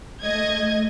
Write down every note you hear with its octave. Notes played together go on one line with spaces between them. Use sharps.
A3 D#5 G#6